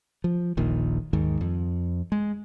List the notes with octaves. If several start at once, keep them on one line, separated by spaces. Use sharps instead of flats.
F3
D#1 A#1 A#2 D#3
D#2 G#2 D#3
F2
G#3